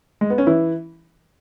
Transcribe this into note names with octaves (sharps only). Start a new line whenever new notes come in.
G#3
B3
C#4
E3 E4